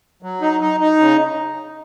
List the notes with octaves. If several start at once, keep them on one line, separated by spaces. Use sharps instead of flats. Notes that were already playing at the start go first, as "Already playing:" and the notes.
F#3
D#4
D#4
D#4
C#3